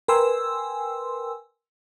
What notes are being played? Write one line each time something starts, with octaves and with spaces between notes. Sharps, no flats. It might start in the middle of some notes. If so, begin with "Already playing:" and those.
A#4 B4 G5 G#5 C6 E6